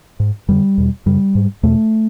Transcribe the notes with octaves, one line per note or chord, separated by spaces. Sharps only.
G#2
F2 D3 G3
E2 B2
F#2 C#3 G3
G#2
E2 B2 A3